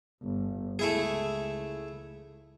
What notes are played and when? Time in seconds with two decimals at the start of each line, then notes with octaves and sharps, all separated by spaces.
0.23 G1
0.79 C#2 A3 E4 G#4